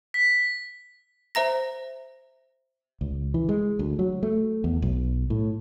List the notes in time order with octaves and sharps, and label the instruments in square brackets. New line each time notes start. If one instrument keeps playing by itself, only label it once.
[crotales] B6
[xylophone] C5 E5 A#5 A#6
[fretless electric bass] C#2
E3
G#3
D2
F#3
A3
E2
B1
A2